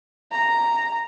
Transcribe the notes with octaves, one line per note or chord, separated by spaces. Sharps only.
A#5